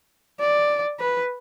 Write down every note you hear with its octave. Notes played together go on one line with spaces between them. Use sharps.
D5
B4